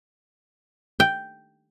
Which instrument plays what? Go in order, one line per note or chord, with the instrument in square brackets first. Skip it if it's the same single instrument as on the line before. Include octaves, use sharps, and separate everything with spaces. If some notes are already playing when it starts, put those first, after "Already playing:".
[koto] G5